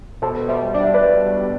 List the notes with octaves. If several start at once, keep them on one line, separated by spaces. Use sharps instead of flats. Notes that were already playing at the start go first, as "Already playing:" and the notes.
B2 A4 C5
G3 C5 E5
D4 D5
E5
B4 D5
B2
B2